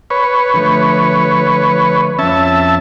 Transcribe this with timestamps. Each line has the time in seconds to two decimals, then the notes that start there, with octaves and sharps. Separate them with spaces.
0.10 B4 C#5
0.54 D3 F3 A3
2.19 F2 C#4 E5 A5